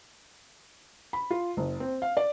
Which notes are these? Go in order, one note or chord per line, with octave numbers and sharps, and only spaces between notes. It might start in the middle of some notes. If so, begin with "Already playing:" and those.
B5
F4
F#1
C4
F5
D5